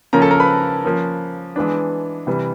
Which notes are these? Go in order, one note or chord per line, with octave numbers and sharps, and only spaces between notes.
C#3 F3 A#3 C#4 A#4 A#5
A4 A5
A#4 A#5
B4 B5
F3 A#3 C#4
E3 G#3 B3 D4
C3 E3 G3